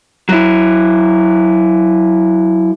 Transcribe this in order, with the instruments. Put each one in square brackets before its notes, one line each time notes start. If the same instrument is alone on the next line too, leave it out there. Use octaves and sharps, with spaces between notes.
[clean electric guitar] F#3 E4